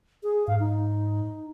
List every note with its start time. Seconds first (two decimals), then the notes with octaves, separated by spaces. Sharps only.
0.23 G#4
0.48 G#2 F5
0.60 D#4